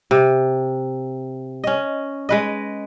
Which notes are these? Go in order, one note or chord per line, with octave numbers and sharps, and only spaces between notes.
C3
C#4 D#5
G#3 B4 D#5